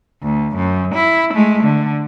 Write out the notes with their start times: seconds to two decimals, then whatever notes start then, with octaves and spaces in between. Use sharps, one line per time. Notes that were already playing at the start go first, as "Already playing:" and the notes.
0.23 D2
0.56 F#2
0.95 E4
1.34 G#3 A3
1.63 D3